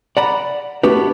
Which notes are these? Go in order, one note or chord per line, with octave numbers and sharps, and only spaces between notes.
D5 F#5 A#5 B5
A3 B3 D4 F#4 G4 B4